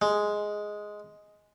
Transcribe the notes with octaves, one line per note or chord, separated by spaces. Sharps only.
G#3